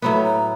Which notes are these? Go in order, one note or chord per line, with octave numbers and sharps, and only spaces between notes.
A2 F#3 B3 B5
A#5